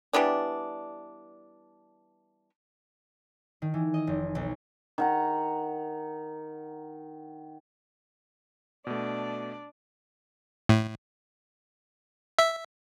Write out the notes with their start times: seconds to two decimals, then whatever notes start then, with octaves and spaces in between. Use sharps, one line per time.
0.13 E3 G3 B3 D4
3.62 D#3
3.74 E3
3.94 D#5
4.07 F1
4.35 B1
4.98 D#3 F#5 A#5
8.87 B2 A3 D4 D5
10.69 A2
12.39 E5